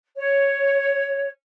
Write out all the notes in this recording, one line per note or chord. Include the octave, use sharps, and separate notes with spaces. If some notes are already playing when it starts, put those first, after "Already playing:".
C#5